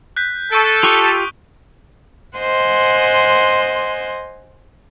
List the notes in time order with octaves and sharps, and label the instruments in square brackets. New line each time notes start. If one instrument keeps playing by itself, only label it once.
[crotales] F#6 G6 B6
[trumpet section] A4 [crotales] C#6 G6 D7
[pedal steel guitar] F4 G4 C#6 [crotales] D#6 G7
[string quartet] C5 D#5 F#5 G#5 C6